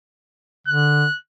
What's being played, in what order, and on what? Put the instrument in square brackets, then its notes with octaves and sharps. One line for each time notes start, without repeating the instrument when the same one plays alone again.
[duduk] D3 [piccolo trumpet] F#6